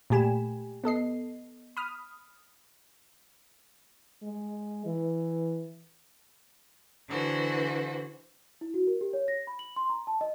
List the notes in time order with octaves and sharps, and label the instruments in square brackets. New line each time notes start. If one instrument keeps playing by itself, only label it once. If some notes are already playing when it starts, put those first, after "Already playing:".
[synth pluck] A#2 A3 G4 G#5 B5 E7
B3 A4 D#5 C7
B5 D#6 F6
[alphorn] G#3
E3
[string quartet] D3 E3 F#4 C5
[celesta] E4
F#4
A#4
G4
C#5
A#6
B5
F#7
C6
A#5
A5
D#5